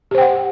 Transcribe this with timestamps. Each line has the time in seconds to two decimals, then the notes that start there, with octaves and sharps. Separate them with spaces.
0.11 G4
0.15 C5
0.18 G5
0.21 F#5